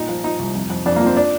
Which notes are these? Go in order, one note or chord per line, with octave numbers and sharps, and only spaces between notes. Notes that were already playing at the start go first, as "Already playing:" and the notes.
Already playing: A#2 D#4
F3
F3 D#4
C2
F2
F2
F2 D4
A#3
F3
C4
D4